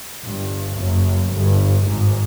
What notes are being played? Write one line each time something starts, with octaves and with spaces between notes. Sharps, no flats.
G1 G2
F#1 F#2
G1 G2
G#1 G#2